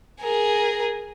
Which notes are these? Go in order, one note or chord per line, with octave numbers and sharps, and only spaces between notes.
G#4 A#4